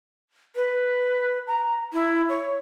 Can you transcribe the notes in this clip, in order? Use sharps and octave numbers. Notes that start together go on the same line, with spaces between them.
B4
A#5
E4
C#5